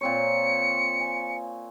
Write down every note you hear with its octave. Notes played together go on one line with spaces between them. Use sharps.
A#2 C4 C#5 C#7
G#5